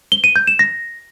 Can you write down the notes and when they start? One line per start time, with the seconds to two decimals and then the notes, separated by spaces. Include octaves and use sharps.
0.12 G7
0.24 D#7
0.36 G6
0.47 E7
0.59 A#6